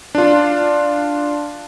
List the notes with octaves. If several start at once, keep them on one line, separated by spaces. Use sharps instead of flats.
D4 F4